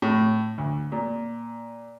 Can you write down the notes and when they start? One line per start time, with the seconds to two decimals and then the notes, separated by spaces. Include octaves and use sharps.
0.02 A2
0.58 D2
0.92 A#2